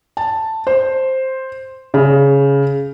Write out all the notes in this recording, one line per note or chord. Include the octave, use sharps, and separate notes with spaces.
A5
C5
C#3